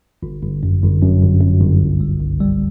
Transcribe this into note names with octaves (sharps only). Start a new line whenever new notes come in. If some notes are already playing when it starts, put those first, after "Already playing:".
G1
G1
F#2
G1
F#2
G1
F#2
G1
C2
G3
C2
G3